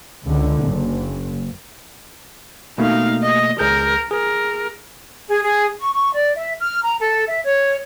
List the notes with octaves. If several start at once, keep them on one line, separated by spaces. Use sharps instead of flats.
C#2 D3
F#1
B2 A3 A#3 D#4 F5
D#5
C#2 G#4 A#4 G6
G#4 A#4
G#4
G#4
C#6
C#6
D5
E5
F6
A#5
A4
E5
C#5